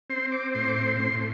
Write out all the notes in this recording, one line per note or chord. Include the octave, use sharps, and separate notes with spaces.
C4 C6
D6
A2 C6
D6
C6
A2 C6